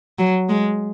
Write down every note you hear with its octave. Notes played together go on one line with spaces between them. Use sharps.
F#3
G#3